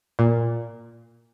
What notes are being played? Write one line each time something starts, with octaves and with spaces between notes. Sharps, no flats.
A#2